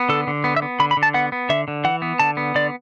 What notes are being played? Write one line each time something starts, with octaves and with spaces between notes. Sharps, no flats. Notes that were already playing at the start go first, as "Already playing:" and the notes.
Already playing: B3
D3 A4
D3
B3
E5
B3
D3 B5
B5
D3
A5
B3 F#5
B3
D3 E5
D3
E3 F#5
B3
D3 A5
B3
D3 D5